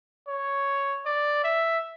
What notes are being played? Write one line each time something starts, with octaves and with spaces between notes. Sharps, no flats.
C#5
D5
E5